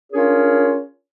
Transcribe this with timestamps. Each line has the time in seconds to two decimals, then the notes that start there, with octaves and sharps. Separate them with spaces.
0.13 C#4 D4 F4 G#4 A#4 C#5